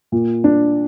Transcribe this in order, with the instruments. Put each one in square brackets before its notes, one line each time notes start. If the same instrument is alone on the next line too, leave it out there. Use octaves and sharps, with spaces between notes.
[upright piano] A#2
D4